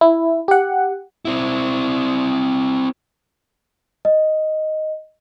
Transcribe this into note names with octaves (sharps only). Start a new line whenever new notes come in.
E4
G4 F#5
C4 E4
D#5